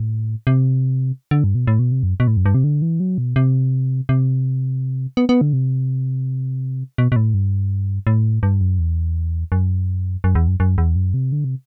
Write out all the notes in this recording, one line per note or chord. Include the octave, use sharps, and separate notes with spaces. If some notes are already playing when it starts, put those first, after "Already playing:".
Already playing: A2
C3
D3
G2
B2
A2
B2
C3
F#2
B2
A2
F#2
G2
C3
D3
E3
F#3
B2
C3
C3
B3
B3
D3
C3
B2
B2
A2
G2
A2
G2
F#2
E2
F#2
F#2
E2
F#2
F#2
E2
F#2
C3
D3
C3